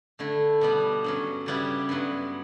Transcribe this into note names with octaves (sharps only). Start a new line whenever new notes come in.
D3 A3 E4
B2 G3 B3
G2 F#3 C#4
C#3 G3 B3 E4 G4
G2 F#3 B3